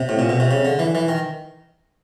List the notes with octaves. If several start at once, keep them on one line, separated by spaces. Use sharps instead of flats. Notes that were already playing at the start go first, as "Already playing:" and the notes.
Already playing: C3
A2
A#2
B2
C3
C#3
D3
E3
E3
D#3